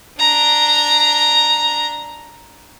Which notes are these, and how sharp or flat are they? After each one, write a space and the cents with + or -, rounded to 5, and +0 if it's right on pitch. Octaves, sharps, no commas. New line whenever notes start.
D4 +0 A#5 +0